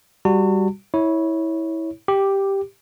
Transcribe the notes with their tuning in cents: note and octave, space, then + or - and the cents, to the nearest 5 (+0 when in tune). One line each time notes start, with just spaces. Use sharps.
G3 +0 F#4 +0 A5 +45
E4 -20 C#5 +0
G4 +0 D6 +10